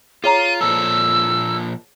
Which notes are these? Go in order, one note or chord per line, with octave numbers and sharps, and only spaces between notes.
F4 G#4 C#5 A#5 D#7
A#2 F3 A4 E6